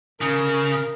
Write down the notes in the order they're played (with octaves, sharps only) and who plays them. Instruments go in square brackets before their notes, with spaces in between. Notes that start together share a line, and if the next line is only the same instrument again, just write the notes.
[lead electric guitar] C#3 [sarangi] A#4